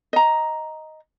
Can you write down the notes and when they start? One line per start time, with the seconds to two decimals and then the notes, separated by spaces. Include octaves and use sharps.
0.13 D#5 A#5